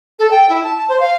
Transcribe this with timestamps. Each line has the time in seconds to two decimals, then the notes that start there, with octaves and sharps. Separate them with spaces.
0.19 A4
0.31 G5
0.49 E4
0.63 A5
0.77 A5
0.89 C5
1.00 F5